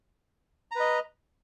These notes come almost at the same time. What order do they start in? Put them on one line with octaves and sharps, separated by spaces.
A#5 B4 D#5